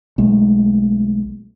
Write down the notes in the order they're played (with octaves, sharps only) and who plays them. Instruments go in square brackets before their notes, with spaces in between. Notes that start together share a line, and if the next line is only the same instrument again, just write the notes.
[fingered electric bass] B1 G#3 A3